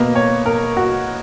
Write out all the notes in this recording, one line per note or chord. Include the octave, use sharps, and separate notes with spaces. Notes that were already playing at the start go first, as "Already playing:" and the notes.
Already playing: B2 A#3 B4
C#5
A#4
F#4